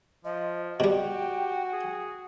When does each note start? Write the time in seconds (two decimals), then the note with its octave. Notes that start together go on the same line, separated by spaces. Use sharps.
0.25 F3 D#5
0.80 B2 G3 F#4 G4 G5
1.73 G#4